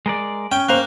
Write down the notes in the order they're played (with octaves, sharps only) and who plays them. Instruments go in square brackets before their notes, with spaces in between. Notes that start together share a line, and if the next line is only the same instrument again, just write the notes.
[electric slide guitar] G#3 A#4 D5
[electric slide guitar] C#4 [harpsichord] G5
[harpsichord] A#3 [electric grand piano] C5 F5 F#6